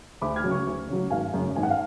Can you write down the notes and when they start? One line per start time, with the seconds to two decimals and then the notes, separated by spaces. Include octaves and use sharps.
0.22 D2 B5 D6
0.36 F6 G#6
0.44 C#3 F#3
0.51 C#6 F6
0.67 D2
0.89 C#3 F#3
1.10 G#1 F5 G#5
1.34 F#2 C#3
1.56 G#1 G#5
1.63 F#5
1.70 F5